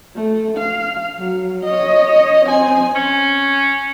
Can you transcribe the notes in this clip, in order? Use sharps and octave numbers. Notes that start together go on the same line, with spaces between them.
A3
F5
F#3
C#5 D#5
C4 G#5
C#4